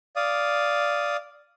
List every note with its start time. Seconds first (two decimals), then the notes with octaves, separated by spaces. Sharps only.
0.16 D5 F5 D#6